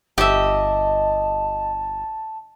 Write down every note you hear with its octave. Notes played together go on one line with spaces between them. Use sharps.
G1 G4 D#5 E5 A5